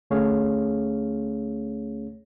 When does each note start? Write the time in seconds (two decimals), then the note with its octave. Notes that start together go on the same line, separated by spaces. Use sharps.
0.11 D2 A3 C#4 G#4 C#5 F5